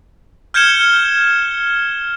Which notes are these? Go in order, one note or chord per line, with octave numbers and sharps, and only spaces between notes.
F6 G6 G#6 C#7 E7 G7